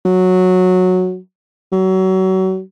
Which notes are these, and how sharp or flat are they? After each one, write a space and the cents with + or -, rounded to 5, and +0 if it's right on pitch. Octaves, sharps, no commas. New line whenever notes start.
F#3 -10
F#3 +30